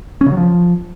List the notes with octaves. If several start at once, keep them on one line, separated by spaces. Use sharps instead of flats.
C#4
C#3
F#3
F3